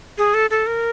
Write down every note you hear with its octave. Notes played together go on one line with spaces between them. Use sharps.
G#4
A4
A4
A#4